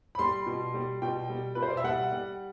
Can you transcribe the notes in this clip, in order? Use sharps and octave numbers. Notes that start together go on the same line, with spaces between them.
B5
G3 C6
B2
G3
B2 G5
G3
B2 B4
C5
D5
E5
G3 F#5
G3